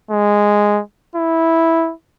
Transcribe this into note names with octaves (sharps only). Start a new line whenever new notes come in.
G#3
E4